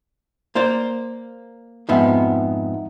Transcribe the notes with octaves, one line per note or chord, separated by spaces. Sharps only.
A#3 C5 D5
F2 G#2 B3 D#4 E5 F#5